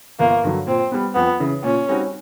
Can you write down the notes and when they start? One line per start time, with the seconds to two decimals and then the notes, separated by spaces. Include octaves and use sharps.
0.20 G1 A#3
0.44 G2 D3 F#3
0.67 A#2 C4
0.92 G3 B3
1.15 F2 B3
1.40 C#3 E3
1.64 A#2 C#4
1.89 G3 C4 D#4 F#4